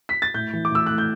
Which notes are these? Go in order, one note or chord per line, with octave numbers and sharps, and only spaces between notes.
B6
A6
A2 G6
E3
D6
A2 E6
A3 F#6
G6